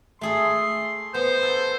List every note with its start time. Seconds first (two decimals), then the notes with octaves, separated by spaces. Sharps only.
0.21 A3 G#4 A4 C6
1.14 B3 C5
1.43 A4